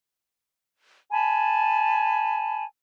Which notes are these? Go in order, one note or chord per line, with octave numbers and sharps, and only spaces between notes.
G#5 A5 B5